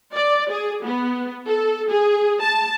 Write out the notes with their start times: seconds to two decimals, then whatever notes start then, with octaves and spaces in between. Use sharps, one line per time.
0.14 D5
0.50 G#4
0.85 B3
1.47 A4
1.90 G#4
2.42 A5